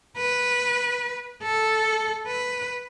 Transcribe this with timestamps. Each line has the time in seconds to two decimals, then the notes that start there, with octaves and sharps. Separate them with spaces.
0.17 B4
1.43 A4
2.27 B4